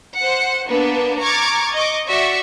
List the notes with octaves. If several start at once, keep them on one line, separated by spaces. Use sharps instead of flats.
C5 F#5
A#3 B3 D4 B4
A#5 C#6 D6 F6 G#6 A6
D#5 C#6 D6
F#4 D5 E5 C#6